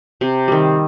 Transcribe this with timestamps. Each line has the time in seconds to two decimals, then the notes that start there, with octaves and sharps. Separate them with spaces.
0.21 C3
0.48 D#3 G3